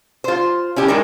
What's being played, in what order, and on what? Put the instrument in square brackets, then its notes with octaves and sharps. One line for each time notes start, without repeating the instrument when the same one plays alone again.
[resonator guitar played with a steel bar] F4 C5
C#4 E4 G4
A2 G#3 D4 D#4 A#4